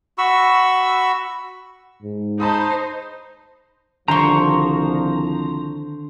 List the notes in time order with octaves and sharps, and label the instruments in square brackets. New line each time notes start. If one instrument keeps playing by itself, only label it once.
[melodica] F#4 B5 C#6 E6
[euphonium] G#2
[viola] D#4 C5 [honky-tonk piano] A5 B5 D#6
[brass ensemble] C2 F3 [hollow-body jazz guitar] D3 D#3 C6 [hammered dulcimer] C5 C#6 [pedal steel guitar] A#5